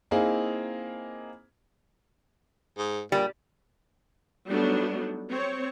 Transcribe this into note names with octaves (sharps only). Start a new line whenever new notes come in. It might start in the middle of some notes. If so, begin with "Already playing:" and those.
A#3 C4 D#4 E4 G#4
G#2
A#2 G3
F#3 G3 A3 B3 D4 D#4
C4 C#5